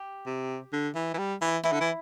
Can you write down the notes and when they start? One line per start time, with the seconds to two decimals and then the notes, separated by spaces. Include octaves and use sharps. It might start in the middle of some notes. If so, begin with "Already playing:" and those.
Already playing: G4
0.26 C3
0.72 D3
0.95 E3
1.14 E3
1.18 G3
1.42 E3
1.64 E3 E4
1.72 D3
1.80 E3